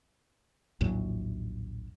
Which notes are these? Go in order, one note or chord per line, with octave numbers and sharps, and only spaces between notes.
A#1 D#2 A2 F#3